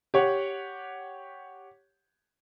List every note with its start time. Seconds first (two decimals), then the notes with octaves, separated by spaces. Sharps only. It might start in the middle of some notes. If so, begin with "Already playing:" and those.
0.14 G4 C#5 F#5